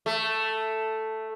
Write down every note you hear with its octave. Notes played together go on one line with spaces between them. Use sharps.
A3